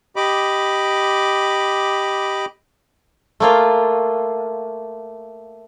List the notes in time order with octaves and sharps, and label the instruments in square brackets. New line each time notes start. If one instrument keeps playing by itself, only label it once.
[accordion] G4 D#5 B5 D6
[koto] A3 A#3 F4